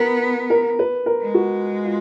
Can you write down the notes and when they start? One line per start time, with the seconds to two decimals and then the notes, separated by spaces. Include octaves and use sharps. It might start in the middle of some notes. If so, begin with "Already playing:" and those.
Already playing: B3 A#4
0.50 A#4
0.79 B4
1.06 A#4
1.21 G#3
1.34 F#4
1.85 F4